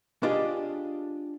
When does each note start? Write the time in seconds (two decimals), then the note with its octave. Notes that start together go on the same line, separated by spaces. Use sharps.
0.23 D4 F4 G4 G#4 D#5